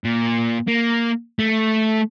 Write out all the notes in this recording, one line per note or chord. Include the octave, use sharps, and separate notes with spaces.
A#2
A#3
A3